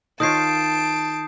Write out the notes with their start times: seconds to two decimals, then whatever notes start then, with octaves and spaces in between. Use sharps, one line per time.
0.20 D#3 F4 C#5 A5 D#6 G6 C7 D7